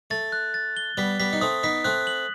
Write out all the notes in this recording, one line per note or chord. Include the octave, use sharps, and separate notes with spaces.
A3 A6
F#6
A6
G7
G3 B3 B6
G3 B3 B6
D#4
A3 C4 D#6
B3 D#4 B6
A3 C4 F#6
F#7